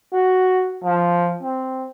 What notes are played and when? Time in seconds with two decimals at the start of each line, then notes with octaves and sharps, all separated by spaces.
0.13 F#4
0.84 F3
1.42 C4